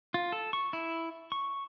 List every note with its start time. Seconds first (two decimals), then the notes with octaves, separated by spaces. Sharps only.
0.14 F4
0.32 A4
0.53 C#6
0.73 E4
1.32 C#6